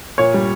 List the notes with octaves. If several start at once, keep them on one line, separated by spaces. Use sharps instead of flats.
A#2 C#5
G3